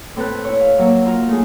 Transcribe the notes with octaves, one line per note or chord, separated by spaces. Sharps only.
A2 C4 A4 B4 F#6
E4 C#5
F5
F#3 A#3 E5
F4 A#4 F5
A3 D#4 G#4